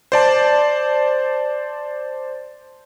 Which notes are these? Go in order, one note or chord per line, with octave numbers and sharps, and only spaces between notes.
C5 D5 A5